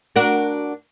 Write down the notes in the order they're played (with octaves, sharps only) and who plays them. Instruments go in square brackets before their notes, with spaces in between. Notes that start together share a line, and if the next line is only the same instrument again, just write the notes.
[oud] D4 F#4 A#4